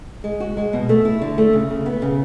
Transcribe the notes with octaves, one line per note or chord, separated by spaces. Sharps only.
G#3
F#4
G#3
B2
A3
E4
D3
A3
C#3
C#3
B3
C#3